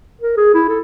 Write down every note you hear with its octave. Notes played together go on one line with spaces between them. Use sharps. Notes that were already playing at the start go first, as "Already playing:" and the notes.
A#4
G#4
E4
A4